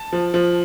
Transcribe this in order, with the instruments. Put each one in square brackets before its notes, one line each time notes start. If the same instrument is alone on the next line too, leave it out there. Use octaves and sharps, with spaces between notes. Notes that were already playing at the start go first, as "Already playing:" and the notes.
Already playing: [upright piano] A5
F3
F3